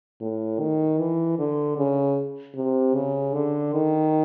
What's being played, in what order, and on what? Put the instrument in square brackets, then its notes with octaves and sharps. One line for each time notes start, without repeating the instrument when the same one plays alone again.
[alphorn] A2
D#3
E3
D3
C#3
C3
C#3
D3
D#3